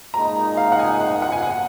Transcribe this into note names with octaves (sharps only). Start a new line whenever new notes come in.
A#2 G#3 D#4 A#5
F5
F#5
G#5
F#5
F#5
G#5
F#5